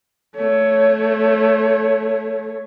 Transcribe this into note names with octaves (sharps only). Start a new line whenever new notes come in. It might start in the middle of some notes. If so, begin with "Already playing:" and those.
A3 C#5